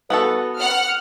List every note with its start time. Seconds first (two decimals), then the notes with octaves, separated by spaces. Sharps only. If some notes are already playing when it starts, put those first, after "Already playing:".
0.10 B3 F#4 A4 B4
0.60 F#5 F6